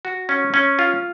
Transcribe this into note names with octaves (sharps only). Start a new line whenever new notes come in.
F#4
C#4
C#4
F4